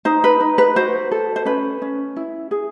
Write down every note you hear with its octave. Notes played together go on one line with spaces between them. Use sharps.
D#4 C5
B4
D#4
B4
F#4 C5
A4
C5
C#4 B4
C#4
E4
G#4